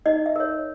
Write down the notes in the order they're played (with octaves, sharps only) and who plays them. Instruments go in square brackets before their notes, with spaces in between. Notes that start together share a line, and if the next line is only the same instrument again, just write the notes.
[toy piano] D#4 D#5
E5
A#4 C#5